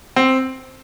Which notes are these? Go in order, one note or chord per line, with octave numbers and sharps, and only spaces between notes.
C4